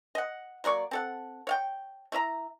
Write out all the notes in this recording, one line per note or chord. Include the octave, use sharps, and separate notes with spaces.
D#5 F#5
F#3 A#3 D5 C#6
C4 A4 F#5
C#5 F5 G5
A3 E4 E5 A#5